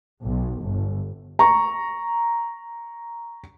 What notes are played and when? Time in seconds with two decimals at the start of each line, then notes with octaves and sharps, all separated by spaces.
0.23 B1
0.63 G1
1.39 A#5 C#6